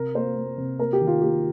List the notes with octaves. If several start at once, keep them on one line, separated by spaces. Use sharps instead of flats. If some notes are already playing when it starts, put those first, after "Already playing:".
Already playing: C3 A#4
A#3 C5
A#3
C3
A#3 A#4
G4
D#3
F4
A#3 G4